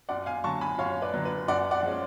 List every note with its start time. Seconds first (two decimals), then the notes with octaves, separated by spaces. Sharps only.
0.09 F#2 D5 F#5
0.26 F5 G#5
0.44 D3 F#3 A5 C#6
0.61 G#5 B5
0.78 F#2 C#5 F5
1.02 B4 D5
1.14 D3 F#3
1.25 B4
1.48 F#2 D5 F#5
1.71 D5 F#5
1.83 F3 G#3 C#4